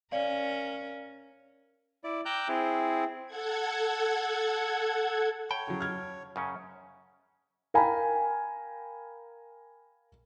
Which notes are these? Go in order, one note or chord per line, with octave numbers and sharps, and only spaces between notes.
C#4 A#4 D5 F5
E4 D5
G5 A#5 D6 E6 F#6 G6
C4 E4 G#4
A4 F#5 G#6
C#5 F#5 G5 A5 B5
C#3 F#3
F6 G#6
F#2 C#3 C#4
A#4 F5 G5 G#5 A#5 B5